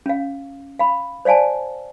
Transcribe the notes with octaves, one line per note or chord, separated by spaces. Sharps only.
C#4 F5
F5 B5
C5 D5 F5 G#5 A5